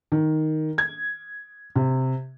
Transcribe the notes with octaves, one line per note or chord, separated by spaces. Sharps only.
D#3
G#6
C3